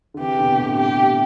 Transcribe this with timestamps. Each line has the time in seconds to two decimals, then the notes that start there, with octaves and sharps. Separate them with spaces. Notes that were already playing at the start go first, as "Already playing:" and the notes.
0.14 D3
0.19 C3 E3 G4
0.39 B2 D3
0.59 A2 C3
0.79 B2 G4